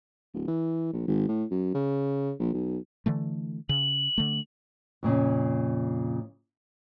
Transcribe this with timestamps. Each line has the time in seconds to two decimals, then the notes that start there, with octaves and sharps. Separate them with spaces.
0.34 D1
0.48 E3
0.93 A#1
1.08 G#1
1.28 A2
1.51 F#2
1.74 C#3
2.39 A#1
2.53 B1
3.06 D3 E3 A3
3.69 C#3 F#7
4.18 D3 A3
5.03 F2 A#2 C#3